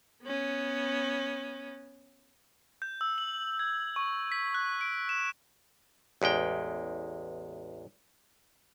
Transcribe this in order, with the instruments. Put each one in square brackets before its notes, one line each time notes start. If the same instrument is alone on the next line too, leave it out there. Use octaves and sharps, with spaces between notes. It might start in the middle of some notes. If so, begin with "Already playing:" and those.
[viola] B3 C#4
[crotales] G6
E6
F#7
G#6
C#6
B6
F#6
D7
E7
[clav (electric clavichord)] A1 E2 G#3 G5